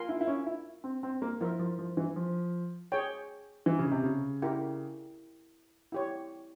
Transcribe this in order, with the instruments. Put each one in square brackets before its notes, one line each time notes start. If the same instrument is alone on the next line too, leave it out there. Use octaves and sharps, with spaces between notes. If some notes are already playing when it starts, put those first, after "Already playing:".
Already playing: [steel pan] F4 A#4 F5 G#5 C6
[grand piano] E4
E4
C#4
E4
C4
C4
A#3
[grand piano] F3 [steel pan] E4 A#4 E5
[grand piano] F3
F3
E3
F3
[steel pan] G#4 C#5 G5
[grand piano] E3
C#3
C3
C#3
[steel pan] E4 G4 A#4
E4 G4 C#5